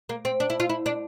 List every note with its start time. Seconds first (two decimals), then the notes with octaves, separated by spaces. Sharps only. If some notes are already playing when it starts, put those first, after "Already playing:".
0.09 A#3
0.25 C4
0.40 D4
0.50 E4
0.60 F4
0.70 E4
0.86 D4